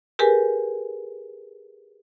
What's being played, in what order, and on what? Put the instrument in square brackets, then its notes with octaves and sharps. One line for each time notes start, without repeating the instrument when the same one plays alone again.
[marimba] G4 G#4 A#4 B4 G#5